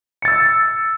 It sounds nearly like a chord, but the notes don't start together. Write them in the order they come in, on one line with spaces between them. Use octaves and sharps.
C#7 A6 E6